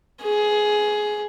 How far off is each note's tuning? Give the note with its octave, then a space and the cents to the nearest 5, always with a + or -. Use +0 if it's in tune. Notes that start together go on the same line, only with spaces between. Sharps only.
G#4 +15